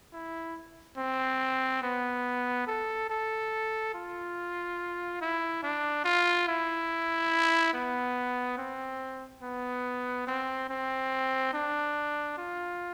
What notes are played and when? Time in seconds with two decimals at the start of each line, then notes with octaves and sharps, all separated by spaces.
0.13 E4
0.98 C4
1.83 B3
2.67 A4
3.10 A4
3.94 F4
5.21 E4
5.63 D4
6.04 F4
6.48 E4
7.74 B3
8.58 C4
9.43 B3
10.27 C4
10.69 C4
11.54 D4
12.38 F4